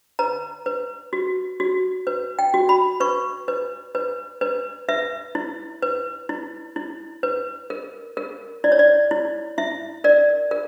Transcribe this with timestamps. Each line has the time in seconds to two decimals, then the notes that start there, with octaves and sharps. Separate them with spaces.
0.19 B4 A#5
0.66 B4
1.13 F#4
1.60 F#4
2.07 B4
2.39 G5
2.54 F#4
2.69 B5
3.00 B4 C#6
3.48 B4
3.95 B4
4.41 B4
4.89 B4 E5
5.35 E4
5.82 B4
6.29 E4
6.76 E4
7.23 B4
7.70 A#4
8.17 A#4
8.64 E4 D5
8.72 C#5
8.79 D5
9.11 E4
9.58 E4 E5
10.04 A#4 D5
10.51 A#4